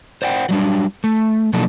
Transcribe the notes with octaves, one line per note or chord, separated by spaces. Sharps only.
C5 D5 F#5 G5
F#3 G3 D4
A3
B2 F3 F#3 A#3 D4 A4